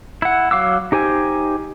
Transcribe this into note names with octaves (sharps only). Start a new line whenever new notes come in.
E4 F#5
F#3 F5 D6 E6
D#4 G4 C5 G#5